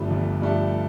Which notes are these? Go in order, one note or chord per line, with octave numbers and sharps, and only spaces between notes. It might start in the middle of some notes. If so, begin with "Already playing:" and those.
Already playing: G1 G2 F3 A3
G1
G2 F3 A3